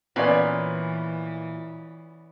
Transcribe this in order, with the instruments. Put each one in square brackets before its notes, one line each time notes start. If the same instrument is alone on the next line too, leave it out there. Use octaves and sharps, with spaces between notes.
[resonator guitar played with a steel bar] A#2 [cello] E3 [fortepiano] B3 C#4 D5